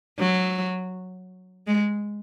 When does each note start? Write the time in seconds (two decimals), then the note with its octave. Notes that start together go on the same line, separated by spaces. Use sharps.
0.19 F#3
1.67 G#3